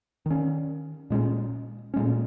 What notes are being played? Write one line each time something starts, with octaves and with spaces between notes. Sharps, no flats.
D#3 C#4
A#2 G#3 C#4
A#2 G#3 C#4